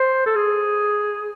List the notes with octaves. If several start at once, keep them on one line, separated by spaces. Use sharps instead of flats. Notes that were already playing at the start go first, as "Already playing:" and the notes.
Already playing: C5
A4
G#4